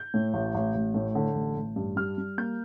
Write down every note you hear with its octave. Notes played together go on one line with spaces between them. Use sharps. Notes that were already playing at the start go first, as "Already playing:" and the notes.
Already playing: G6
A2
A1
A1
A1
A2
D3
A1
A1
G2
G3 F6
G3
A#3 G6